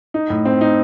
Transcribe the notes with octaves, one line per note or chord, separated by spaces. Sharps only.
D#4
A2
C4
D#4